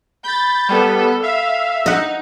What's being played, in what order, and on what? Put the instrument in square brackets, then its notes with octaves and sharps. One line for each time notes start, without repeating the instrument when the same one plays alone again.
[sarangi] B5 [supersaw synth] G6 A6
[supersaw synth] G3 B3 [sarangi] A4
[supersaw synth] E5 [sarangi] F5
[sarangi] D#4 [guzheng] D#5 F#5